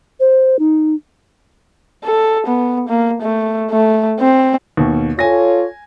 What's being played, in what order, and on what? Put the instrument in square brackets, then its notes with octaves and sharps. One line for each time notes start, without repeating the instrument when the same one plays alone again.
[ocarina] C5
D#4
[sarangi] A4
B3
A#3
A3
A3
C4
[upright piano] D#2 B2
[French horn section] F4 A4 C#5 [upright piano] G#5 A#6